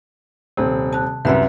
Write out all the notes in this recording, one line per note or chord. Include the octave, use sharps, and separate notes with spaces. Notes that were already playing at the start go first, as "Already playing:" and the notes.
D#1 C3 C4
A5 F#6
C2 F#2 B4 E5 F#5